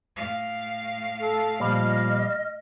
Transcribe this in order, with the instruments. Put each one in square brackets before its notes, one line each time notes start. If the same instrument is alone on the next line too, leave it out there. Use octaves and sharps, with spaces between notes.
[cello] A2 F5
[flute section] A4
[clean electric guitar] A#2 F3 G3 [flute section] D#5 F6